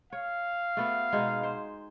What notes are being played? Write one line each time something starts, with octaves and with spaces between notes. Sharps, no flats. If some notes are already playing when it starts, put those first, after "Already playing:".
C#5 F5
A3 B3 F#4
B2 G#3 D#4
C5